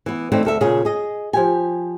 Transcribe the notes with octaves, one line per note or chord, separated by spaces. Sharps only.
E3 B3
E3 A3 C4 D4 D#4
D2 A4 E5
A#2 C#3 G#4
G#4 D#5
F3 G4 G#5